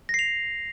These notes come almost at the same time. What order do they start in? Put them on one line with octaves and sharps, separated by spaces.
A#6 C7 F7